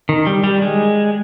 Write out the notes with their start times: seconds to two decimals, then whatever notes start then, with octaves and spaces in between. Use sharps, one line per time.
0.09 D#3
0.26 G3
0.44 G3
0.62 G#3